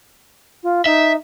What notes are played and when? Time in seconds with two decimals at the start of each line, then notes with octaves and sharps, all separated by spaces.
0.63 F4
0.86 D#4 E5